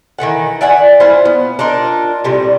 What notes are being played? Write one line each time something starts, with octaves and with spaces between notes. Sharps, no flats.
D#3 E3 A4 F#5
D5 E5 F#5 G#5
E4 F4 B4 C5
B3
D4 D#4 F4 A#4
A2 C3 G3